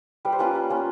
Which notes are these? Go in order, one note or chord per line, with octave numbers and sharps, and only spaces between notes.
G3 B4
C5
A#3 C#4 F4 B4
G3
A#3 C#4 F4